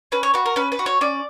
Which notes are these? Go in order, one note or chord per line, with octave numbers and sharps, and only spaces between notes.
C#4 B4
C#5
F#4 B4
A#4
C#4 B4
B4
F#4
C#5
C#4 D5